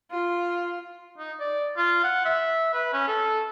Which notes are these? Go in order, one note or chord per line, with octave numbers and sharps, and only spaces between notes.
F4
D#4
D5
F4
F#5
E5
B4
C#4
A4